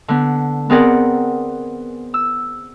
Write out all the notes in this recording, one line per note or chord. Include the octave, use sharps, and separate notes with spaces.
D3 B3
B3 C4 G#4 A#4 D5 F#5
E6